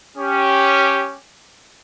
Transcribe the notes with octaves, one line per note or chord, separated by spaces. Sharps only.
C#4 G4